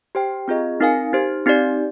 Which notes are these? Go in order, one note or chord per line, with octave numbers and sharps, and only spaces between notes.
G4 C5 G5
C4 F4 G#4 D#5
C4 D#4 A#4 F5 G#5
D#4 G4 C5
C4 D#4 G4 D5